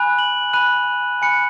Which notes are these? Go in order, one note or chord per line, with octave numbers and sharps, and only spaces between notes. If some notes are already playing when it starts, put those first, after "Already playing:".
Already playing: G#5 B5 F#6
F#7
G#5 B5 F#6 D#7
G#5 B5 F#6 C#7